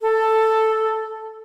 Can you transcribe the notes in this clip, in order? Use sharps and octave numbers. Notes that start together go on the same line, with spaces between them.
A4